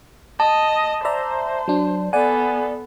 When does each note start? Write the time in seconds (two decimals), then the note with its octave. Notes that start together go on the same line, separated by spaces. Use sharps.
0.40 D#5 A5
1.05 C5 D5 E5 A#5
1.68 F#3 D4
2.13 B3 A4 D5 F#5 G#5